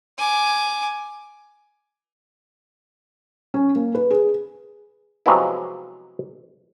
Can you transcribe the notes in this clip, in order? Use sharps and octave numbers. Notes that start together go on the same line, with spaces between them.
G#5 D6
C#4
A#3
B4
G#4
C3 F3 F#3 G#3 B3 E4